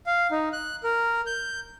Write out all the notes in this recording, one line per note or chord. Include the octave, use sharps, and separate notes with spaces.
F5
D#4
F#6
A#4
G6